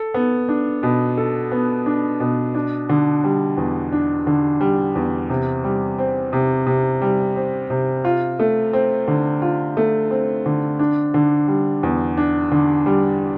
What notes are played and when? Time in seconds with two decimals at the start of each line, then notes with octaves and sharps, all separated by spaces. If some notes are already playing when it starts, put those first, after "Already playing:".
Already playing: A4
0.14 B3
0.49 D4
0.83 B2
1.17 A4
1.52 B3
1.86 D4
2.20 B2
2.55 D4
2.89 D3
3.24 G3
3.57 E2
3.92 D4
4.27 D3
4.61 G3
4.95 E2
5.29 C3
5.64 G3
5.99 C4
6.33 C3
6.67 C3
7.02 G3
7.36 C4
7.70 C3
8.05 F4
8.39 A3
8.73 C4
9.08 D3
9.42 F4
9.77 A3
10.11 C4
10.46 D3
10.79 D4
11.14 D3
11.48 G3
11.83 E2
12.17 D4
12.51 D3
12.86 G3